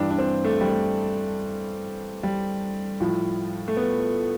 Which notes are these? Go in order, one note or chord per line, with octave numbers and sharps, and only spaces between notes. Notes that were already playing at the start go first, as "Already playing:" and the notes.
Already playing: G2 E3 G3 D4
D4
C4
A3
G3
A3
G3
A2 F3
A3
B3